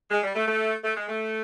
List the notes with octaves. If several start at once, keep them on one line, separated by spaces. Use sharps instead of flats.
G#3
G3
A3
A3
A3
G#3
A3